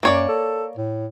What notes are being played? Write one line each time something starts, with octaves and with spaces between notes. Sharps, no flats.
F#2 A#3 C#5 D5
A4
A2